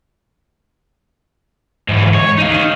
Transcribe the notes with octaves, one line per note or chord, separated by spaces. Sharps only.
G#2 E3
C#5
D#4 F5